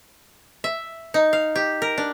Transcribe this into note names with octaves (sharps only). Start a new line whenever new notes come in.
E5
D#4
F5
G4
A#4
D4